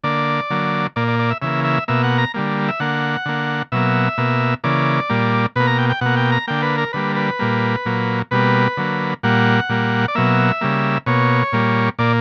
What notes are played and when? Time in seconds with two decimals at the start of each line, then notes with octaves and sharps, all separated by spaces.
0.04 D3 A#3 D5
0.50 D3 F#3 A#3
0.96 A#2 A#3 D5
1.08 D5
1.19 D5
1.30 E5
1.42 C#3 E3 A#3 E5
1.64 E5
1.88 B2 A#3 E5
2.04 F#5
2.18 A#5
2.34 D3 G3 A#3
2.68 E5
2.80 D3 A#3 F#5
3.26 D3 A#3
3.72 B2 F#3 A#3 E5
4.18 B2 A#3
4.64 C#3 E3 A#3 D5
5.09 A#2 G3 A#3
5.56 B2 A#3 B4
5.67 A#5
5.78 G5
5.90 G5
6.01 B2 A#3 F#5
6.17 G5
6.32 A#5
6.47 D3 A#3 G5
6.62 B4
6.78 A#4
6.93 D3 G3 A#3 B4
7.16 B4
7.39 A#2 G3 A#3
7.85 A#2 F#3 A#3
8.31 B2 G3 A#3 B4
8.77 D3 F#3 A#3
9.23 A#2 G3 A#3 F#5
9.69 A#2 G3 A#3
10.08 D5
10.15 B2 F#3 A#3 E5
10.61 C#3 G3 A#3
11.06 B2 A#3 C#5
11.52 A#2 G3 A#3
11.99 A#2 A#3 D5